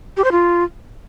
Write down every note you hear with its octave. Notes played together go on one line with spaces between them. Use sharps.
G4
C5
F4